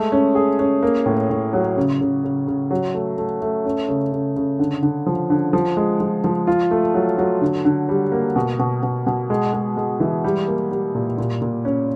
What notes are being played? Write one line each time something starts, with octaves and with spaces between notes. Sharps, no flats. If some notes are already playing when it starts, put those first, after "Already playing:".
Already playing: G#3 A3
C#4
G#4
C#4
A#3
A2
A2
F#3
C#3
C#3
C#3
C#3
F#3
A3
A3
A3
C#4
C#3
C#3
C#3
D3
D3
F3
D3
F3
G#3
F3
F3
F4
A3
F#3
F#3
D3
D3
G3
A#3
B2
B2
B2
B2
G#3
G#3
G#3
E3
G3
A#3
G3
A#2
A#2
A#2
C#4